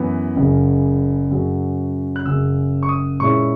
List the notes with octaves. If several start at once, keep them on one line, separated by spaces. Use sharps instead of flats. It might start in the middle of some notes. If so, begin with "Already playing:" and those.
Already playing: F#2 E3 B3 E4
F#1 F#2 C#3
F#2 C#3 F#3
F#6
F#1 F#2 C#3 E6
C#6
D#6
A#2 G#3 C#4 E4 C#6